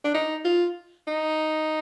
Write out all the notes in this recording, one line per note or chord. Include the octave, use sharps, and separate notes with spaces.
D4
D#4
F4
D#4